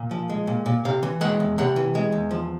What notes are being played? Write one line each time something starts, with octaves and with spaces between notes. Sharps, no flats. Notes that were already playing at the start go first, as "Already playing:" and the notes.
Already playing: A#2
F3
G#3
A#2
A#2
C3 F5
E3
G#3 F#5
E2
C3 F#5
E3
G#3
E2
F3